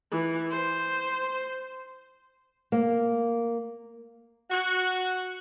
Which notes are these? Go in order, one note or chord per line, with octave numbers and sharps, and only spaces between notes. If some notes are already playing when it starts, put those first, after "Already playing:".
E3
C5
A#3
F#4